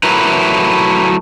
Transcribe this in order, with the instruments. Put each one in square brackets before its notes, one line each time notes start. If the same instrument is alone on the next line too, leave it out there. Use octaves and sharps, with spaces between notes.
[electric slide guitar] F#3 A3 E4 A#4 B4